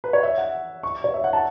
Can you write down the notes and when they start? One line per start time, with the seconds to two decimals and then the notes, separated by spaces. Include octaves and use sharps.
0.04 B4
0.13 C#5
0.23 E5
0.38 F#5
0.83 C#6
1.04 C#5
1.14 E5
1.24 F#5
1.33 A5